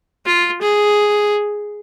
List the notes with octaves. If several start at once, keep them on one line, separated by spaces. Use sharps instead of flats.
F4
G#4